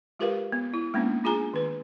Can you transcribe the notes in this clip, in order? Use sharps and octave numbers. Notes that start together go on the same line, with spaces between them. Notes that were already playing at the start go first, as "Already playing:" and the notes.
G#3 F4 G4 A#4 B4 F5
B3
E4
G#3 A#3 B3 C#4 D4
D4 F4 G#4 G#5 A#5
D#3 B4